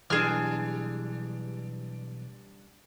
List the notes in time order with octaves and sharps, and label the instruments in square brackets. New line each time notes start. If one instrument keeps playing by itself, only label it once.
[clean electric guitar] B1 E3 [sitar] G3 D4 [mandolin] G#4 F6